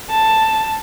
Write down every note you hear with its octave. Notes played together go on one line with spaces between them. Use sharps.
A5